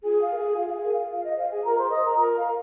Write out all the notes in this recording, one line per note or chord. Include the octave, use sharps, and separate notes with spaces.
F4 G#4 G#5
F5
A#4
G#4 G#5
F4 F5
F5
G#4 G#5
A#4
F5
F4 F5
D#5
C5 F5
G#4 G#5
F4 A#4 A#5
C5 C6
C5 D#5 D#6
A#4 A#5
F4 A#4 A#5
F5
A#4